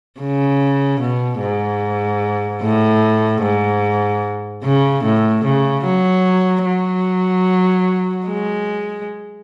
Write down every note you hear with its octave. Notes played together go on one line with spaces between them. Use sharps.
C#3
B2
G#2
A2
G#2
C#3
A2
C#3
F#3
F#3
G#3